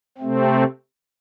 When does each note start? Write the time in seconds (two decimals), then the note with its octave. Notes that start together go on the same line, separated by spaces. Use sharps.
0.18 C3 A3 C4